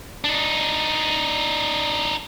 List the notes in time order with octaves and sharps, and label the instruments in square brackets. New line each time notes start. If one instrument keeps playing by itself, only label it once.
[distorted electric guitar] D4 D#4